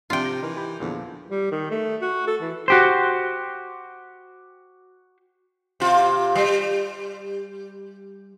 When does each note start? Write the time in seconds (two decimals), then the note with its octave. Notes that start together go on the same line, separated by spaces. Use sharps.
0.10 C3 F3 D4 F4 E5 G5
0.24 G4 A#6
0.42 E3 D#4 A#4
0.56 G4 B5 G6
0.80 E2 A#2 D3 F3
1.30 G3
1.51 D#3
1.71 A3
2.02 F#4
2.27 A4
2.42 E3
2.68 F#4 G4 C5
5.80 C3 F4
6.35 G3